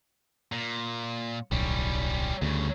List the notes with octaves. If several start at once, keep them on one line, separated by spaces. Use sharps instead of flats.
A#2
D1 B1 G3 C#4
D2 G2 C#3